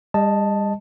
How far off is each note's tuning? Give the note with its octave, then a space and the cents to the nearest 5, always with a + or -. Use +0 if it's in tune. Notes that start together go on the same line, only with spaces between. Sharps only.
G3 +40 D#5 +0 A5 +0